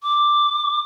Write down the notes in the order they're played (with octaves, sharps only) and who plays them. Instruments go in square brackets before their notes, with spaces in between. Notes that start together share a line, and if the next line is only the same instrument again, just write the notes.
[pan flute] D6